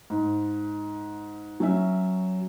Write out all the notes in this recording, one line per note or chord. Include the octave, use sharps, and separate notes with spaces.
G#2
F#3 C#4 E5